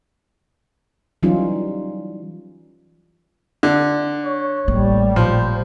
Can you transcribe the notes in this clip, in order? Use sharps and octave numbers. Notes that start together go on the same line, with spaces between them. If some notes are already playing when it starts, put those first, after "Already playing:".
E3 F#3 G3 C#4 D#4 F4
D3
C#5
A1 G3 A3 A#3
A#2 F3 C5